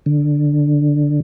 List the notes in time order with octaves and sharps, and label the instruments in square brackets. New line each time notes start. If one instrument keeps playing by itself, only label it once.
[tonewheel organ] D3